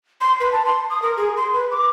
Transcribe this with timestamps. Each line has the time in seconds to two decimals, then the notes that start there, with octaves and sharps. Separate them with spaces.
0.21 C6
0.40 B4
0.52 A5
0.65 C6
0.90 D#6
1.02 A#4
1.17 G#4
1.37 C6
1.54 B4
1.71 D6